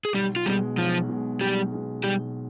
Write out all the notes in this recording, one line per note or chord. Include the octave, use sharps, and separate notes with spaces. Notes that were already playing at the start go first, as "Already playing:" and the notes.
G#4
B1 G3 G4
F4
B2 G3 G#3 G4
B1 F3 F4
B2 G#3
B1 G3 G4
B2 G#3
B1 G3 G4